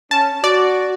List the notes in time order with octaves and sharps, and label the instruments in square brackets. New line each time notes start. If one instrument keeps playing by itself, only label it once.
[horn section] C#4 [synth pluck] A5
[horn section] F#4 [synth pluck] D5